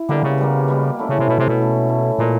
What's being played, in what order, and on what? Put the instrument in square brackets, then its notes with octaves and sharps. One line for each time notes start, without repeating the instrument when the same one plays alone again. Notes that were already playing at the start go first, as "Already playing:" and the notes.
Already playing: [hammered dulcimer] E4
[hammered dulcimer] B2 G3 A#3 [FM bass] D3
[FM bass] C#3
[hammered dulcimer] B2 G3 A#3
B2 G3 A#3
A3 C#4 E4
[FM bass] C#3
C3
[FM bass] B2 [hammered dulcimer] A3 C#4 E4
[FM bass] C3
B2
[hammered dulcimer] A3 C#4 E4
A3 C#4 E4
[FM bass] A#2 [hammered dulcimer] E3 G#3